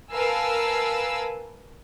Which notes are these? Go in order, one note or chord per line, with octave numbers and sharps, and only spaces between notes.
A#4 B4 F5 G#5 A5 E6